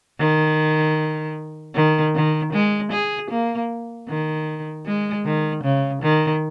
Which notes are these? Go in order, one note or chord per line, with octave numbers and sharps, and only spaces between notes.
D#3
D#3
D#3
G#3
G#4
A#3
D#3
G#3
D#3
C#3
D#3